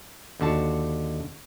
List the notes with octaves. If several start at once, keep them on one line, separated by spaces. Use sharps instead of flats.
D#2 D3 F#4 A5